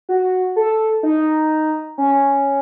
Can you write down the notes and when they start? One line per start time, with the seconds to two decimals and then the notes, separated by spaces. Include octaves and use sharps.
0.09 F#4
0.56 A4
1.03 D#4
1.98 C#4